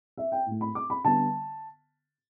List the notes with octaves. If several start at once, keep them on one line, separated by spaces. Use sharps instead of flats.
E5
G5
A2 A3
B5
D6
B5
D3 G3 B3 A5